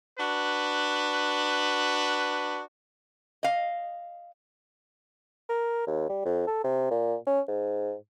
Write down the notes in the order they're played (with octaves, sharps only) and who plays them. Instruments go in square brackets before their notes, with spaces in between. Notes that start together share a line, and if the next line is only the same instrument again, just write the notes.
[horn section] D4 F#4 B4
[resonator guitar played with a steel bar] D#5 F5
[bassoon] A#4
D#2
G3
F2
A4
C3
A#2
C#4
G#2